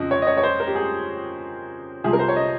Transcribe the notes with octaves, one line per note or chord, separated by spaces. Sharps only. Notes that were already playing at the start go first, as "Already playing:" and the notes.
Already playing: F2 C#3 F3 D#5
C#5
D#5
C#5
C#5
C5
A#4
G4
G#4
C2 C3 F3 G#4
A#4
C5
C#5
D#5